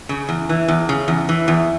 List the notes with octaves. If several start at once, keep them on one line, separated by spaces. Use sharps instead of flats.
C#3
E2
E3
E2
C#3
E2
E3
E2